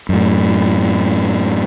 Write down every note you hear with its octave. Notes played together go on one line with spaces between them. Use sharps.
F#2 A2